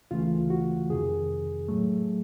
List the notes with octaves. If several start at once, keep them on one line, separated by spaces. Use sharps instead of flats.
D2 C#3 E3 A3 F4
F#4
F2 C3 D#3 G#4
A2 F#3 A3